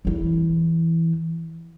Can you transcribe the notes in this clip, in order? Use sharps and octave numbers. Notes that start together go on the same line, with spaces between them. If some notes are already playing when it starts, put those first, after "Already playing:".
E2 E3